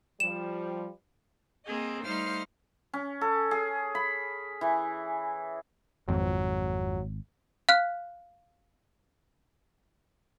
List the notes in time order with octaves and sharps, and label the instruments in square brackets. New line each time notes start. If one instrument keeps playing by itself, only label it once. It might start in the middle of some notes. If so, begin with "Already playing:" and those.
[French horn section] F3 G3 [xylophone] E7
[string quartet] A#3 C4 G#4 D#5
G3 A3 D#4 C5 F5 F6
[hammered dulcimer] C#4
A4
G#4
B5
E3
[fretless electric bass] G#1 [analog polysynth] F2 [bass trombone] F#3
[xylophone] F5 F6 F#6